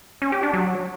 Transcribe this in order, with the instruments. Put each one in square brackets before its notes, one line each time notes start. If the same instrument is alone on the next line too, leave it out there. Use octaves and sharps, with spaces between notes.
[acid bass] C#4
G4
D4
F#3